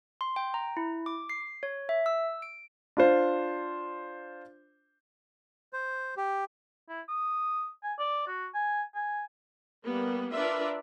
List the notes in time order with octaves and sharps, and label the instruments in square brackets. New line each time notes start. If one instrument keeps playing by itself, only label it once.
[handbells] C6
G5
A#5
E4
D6
C7
C#5
E5
E6
D7
[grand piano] D4 F4 C5
[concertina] C5
G4
[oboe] E4
D#6
G#5
D5
F#4
G#5
G#5
[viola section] G3 A#3 B3
D4 F4 A#4 B4 D5 E5